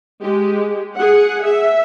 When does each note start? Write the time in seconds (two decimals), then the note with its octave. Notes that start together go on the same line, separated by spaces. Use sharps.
0.22 G#3 G4
0.97 G#4 F#5
1.44 E5